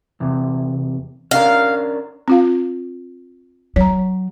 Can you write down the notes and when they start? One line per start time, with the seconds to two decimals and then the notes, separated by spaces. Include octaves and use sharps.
0.20 E2 C3
1.31 C#4 D4 A#4 F5
2.28 C4 F4 F5
3.76 F#3 C#5 A#5